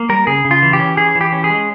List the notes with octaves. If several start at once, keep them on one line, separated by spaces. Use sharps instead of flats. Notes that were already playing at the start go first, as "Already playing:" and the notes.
Already playing: A#3
G3 A#4
C#3 G#4
C#3
F4
E3
G4
C#4
E3 G#4
E3
G4
C#4
G#4
G#3